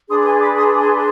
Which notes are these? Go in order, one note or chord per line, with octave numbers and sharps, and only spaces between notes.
D4 G#4 B4 C6 D#6
D6
G#5 C6
B5 D6
C6 D#6
G#5 C6
C6